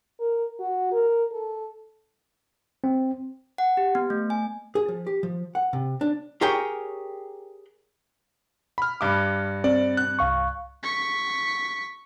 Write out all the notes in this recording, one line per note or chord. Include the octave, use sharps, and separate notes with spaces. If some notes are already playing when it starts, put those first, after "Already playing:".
A#4
F#4
A#4
A4
C4
F#5
G4
B3
A3
G#5
G#4
F3
G4
F3
F#5
C3
D4
G4 G#4 A#4 C#5 G5
B5 F6
G2 D6
C4 D5
F#6
C2 F5 C#6
C#6 B6